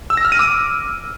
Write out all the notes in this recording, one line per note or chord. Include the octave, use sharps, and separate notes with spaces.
E6
A#6
F6
D#7
D6